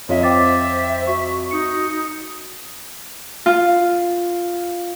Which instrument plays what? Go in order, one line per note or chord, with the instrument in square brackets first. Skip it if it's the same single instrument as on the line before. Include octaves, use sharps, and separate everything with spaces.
[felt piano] F2 F4 D#5 [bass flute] C#5 [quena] E5
[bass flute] C5 [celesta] G5 D6 A6
[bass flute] F#4 [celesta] C#6
[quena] D#4 [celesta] C#7
[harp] F4